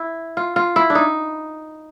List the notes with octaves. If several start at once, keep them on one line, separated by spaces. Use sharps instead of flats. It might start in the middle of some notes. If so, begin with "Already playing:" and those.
Already playing: E4
F4
F4
E4
D4
D#4